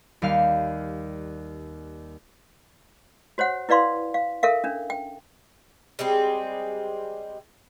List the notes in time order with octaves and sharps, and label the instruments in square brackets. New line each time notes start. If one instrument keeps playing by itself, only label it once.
[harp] D#2 G3 F5 F6
[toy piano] F#4 C5 C#5 F#5
E4 B4 D5 F5 C6
F5
A4 A#4 E5 F5
C#4 D4
G5
[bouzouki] G3 G#3 C4 G#4